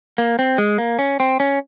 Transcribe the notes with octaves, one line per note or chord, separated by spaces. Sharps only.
A#3
C4
G#3
A#3
C#4
C4
C#4